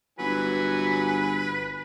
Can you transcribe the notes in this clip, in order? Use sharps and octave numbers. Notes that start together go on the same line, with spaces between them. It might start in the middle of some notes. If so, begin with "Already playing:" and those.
G1 E3 F#3 B4 G#5